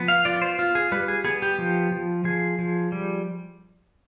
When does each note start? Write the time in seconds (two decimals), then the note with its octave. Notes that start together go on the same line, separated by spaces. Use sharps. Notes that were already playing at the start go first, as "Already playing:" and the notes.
Already playing: F3 B3
0.08 F5
0.25 F4 D5
0.42 C5
0.59 F4
0.75 G#4
0.92 G3 B4
1.08 G#4
1.25 B3 G#4
1.42 G4
1.59 F3
1.92 F3
2.24 F3 G#4
2.59 F3
2.92 G3